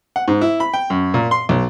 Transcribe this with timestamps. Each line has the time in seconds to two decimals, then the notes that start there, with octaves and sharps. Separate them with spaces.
0.16 F#5
0.28 G#2
0.41 E4
0.60 B5
0.74 G5
0.90 F#2
1.14 A#2
1.31 C6
1.49 B1